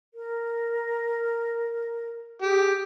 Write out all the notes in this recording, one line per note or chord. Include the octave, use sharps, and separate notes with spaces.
A#4
G4 G#4